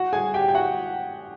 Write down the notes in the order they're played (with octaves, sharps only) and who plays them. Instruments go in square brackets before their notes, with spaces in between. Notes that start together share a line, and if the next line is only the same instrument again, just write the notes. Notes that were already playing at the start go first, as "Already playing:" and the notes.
Already playing: [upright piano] F#4 F#5
G#4 G#5
G4 G5
G5
F#4 F#5